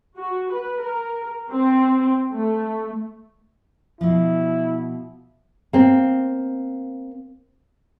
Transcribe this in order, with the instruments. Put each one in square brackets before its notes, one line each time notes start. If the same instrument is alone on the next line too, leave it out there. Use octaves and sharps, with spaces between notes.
[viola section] F#4
B4
A#4
C4
A3
[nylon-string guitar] B2 F3 [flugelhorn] E4
[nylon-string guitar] A#3 C4